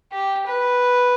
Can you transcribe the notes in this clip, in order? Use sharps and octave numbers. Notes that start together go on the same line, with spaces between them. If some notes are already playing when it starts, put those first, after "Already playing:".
G4
B4